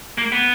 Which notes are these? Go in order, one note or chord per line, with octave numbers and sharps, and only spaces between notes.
A#3
B3